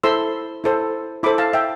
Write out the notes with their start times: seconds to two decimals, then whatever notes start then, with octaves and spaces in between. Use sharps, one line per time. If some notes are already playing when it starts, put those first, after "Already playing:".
0.03 E4 A4 C5 C6 E6
0.64 E4 A4 C5
1.23 E4 A4 C5 B5 D6
1.38 F5 A5
1.53 E5 G5